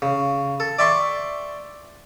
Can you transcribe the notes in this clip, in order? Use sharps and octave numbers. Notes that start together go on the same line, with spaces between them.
C#3
A4
D5 E5 G5 C6 C#6